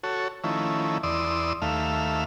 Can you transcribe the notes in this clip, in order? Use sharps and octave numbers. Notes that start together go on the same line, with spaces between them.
F#4 A4 C#5
D#3 F3 A3 C#4 E4
E2 D5 C6 D#6 E6
D#2 A3 E5 F5